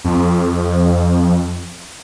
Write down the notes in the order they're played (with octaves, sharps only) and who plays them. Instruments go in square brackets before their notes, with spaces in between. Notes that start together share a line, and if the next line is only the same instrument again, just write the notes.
[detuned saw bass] F2